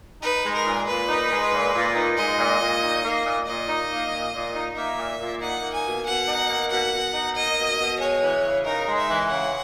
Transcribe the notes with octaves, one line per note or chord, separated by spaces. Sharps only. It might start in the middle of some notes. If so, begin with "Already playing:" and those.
D#4 B4
G#3
A#4
A#2
A#2 B4
D#4
G#3
A#2
A#2
D#4
G#3 D#5
A#2
A#2
D#4
A#3
A#2
A#2 D#5
D#4
A#3
A#2
A#2
D#4
A#3 E5
A#2
A#2
D#4 F#5
A#3
G#5
B2
B2 F#5
D#4
A#3
B2 F#5
B2
D#4
A#3 D#5
B2
B2
G#3 C#5
E3
C#3
D#4 A#4
G#3
E5
E3
C#3 F#5